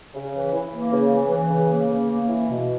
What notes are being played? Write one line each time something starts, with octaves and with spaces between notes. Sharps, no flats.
C#3
E3
E3
A#3
C#3
E3
E3
C#3
A#3
C#3
A#3
E3
B2